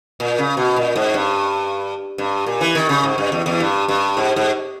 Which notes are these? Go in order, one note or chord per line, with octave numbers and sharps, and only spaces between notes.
A#2
C#3
B2
A#2
G#2
G2
G2
A#2
E3
D#3
C#3
G#2
G2
E2
E2
G2
G2
G#2
G#2